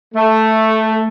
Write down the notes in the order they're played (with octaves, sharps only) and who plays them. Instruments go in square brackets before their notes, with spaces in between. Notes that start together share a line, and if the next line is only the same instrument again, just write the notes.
[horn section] A3